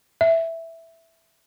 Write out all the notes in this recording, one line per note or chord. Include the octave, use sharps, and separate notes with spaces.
E5